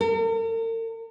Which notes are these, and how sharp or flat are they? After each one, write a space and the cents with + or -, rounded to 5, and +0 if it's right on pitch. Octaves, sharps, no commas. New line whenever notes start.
A#4 -45